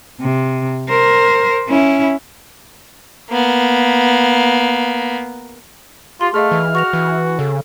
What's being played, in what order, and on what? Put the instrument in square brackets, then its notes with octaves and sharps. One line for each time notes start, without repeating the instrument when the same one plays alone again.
[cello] C3
A#4 C5
C#4 E4
[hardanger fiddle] A#3 B3
[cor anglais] F4 [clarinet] G4 [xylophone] C6
[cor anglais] A3 [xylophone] G#4 D#5 F5 [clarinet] F6
[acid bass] E3
[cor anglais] F#4 [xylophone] C#6 A#6 F7
[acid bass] E3
[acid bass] C#3 [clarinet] A4